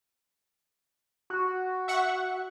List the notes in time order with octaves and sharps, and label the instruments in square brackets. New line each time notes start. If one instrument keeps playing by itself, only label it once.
[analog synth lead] F#4
[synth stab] E5 F#5 C#6